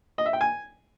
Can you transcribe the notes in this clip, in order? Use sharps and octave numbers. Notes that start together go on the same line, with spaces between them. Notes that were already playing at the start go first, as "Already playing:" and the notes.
D#5
E5
G5
G#5